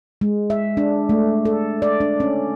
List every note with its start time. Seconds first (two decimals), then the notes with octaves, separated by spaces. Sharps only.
0.21 G#3
0.50 E5
0.77 D4
1.09 A3
1.45 A4
1.82 D5
2.01 D4
2.20 C#4